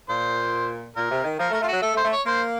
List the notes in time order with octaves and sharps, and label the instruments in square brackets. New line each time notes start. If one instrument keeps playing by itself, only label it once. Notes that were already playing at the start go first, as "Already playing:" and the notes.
[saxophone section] A#2 [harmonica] C5
[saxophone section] A#2 [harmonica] A#4
[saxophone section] C3
D#3
[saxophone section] F3 [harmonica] A#4
[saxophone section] A3
[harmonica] A#4
[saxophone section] A3 [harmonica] F4
[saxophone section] F#3 [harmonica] F#4
[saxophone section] A3 [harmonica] A4
[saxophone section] A3 [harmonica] C5
[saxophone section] A3
[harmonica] C#5
[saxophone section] A#3 [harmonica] C5